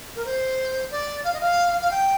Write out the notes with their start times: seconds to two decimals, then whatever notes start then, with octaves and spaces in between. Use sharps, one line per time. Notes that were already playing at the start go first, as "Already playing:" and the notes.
0.16 A#4
0.25 C5
0.91 D5
1.24 F5
1.34 D#5
1.41 F5
1.81 F5
1.91 G5